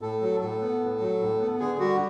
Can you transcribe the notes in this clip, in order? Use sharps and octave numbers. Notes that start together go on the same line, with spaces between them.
A2 A4
F#3
A2 A4
B3
A2
F#3
A2
B3
D3 G#4
G3 F#4